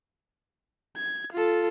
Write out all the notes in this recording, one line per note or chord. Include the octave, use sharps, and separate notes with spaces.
G#6
F4 A4